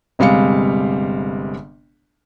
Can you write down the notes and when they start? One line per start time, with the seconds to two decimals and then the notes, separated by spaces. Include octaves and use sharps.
0.19 G1 C3 G3 G#3 F5 C#7